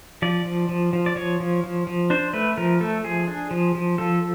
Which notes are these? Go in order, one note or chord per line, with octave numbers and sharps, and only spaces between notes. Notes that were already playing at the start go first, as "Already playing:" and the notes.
F3 D5
F3
F3
F3
D5
F3 C#5
F3
F3
F3
D4 C5
A3 B4
F3 A#4
A3 A4
F3 G#4
D4
F3
F3
F3 A4